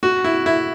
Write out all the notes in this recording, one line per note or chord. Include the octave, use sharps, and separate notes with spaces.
F#4
E4
E4